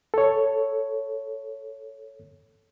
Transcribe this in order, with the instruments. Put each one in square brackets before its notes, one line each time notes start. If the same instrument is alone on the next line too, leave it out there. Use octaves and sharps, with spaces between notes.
[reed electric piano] A4 C#5